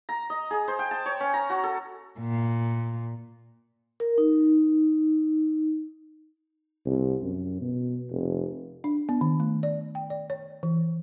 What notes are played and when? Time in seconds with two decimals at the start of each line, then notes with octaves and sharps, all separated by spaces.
0.09 A#5
0.30 D#5
0.51 G#4
0.68 C5
0.79 G5
0.91 A5
1.06 C#5
1.20 C#4
1.34 A#5
1.50 F#4
1.64 A4
2.20 A#2
4.00 A#4
4.18 D#4
6.86 C2
7.23 F#2
7.61 B2
8.10 F1
8.84 D4
9.09 B3
9.21 D#3
9.40 A3
9.63 D5
9.95 G5
10.10 D5
10.30 C#5
10.63 E3